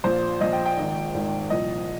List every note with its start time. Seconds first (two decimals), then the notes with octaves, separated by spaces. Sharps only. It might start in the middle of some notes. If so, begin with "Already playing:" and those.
0.04 A#1 A#2 F3 C5
0.41 A#1 A#2 F3 D#5
0.53 G5
0.66 G5
0.77 G#1 G#2 D#3
1.14 G#1 G#2 D#3
1.50 C2 A#2 F3 D#5